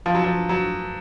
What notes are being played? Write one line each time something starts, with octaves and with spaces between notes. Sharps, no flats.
F3
F#3
F3
F#3